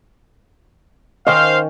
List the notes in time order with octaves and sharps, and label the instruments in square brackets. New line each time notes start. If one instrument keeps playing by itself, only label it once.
[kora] D#3 C#4 [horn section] C5 F5 [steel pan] D#5